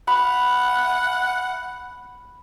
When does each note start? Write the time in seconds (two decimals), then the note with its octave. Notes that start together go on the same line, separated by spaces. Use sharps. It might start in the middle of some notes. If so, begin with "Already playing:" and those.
0.08 F#5 B5